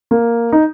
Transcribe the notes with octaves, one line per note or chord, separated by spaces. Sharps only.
A#3
D#4